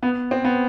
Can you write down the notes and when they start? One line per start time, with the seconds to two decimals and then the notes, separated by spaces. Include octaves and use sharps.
0.03 B3
0.31 C4
0.44 B3